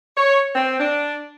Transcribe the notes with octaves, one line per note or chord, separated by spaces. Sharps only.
C#5
C4
D4